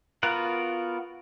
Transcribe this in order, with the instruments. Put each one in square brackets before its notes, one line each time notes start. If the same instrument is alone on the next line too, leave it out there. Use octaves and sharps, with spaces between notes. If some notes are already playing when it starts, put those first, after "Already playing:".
[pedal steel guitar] B3 F4 F#4 A#4 F#5